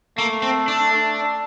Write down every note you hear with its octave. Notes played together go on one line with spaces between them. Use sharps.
A3 A#3
C4
D4
A3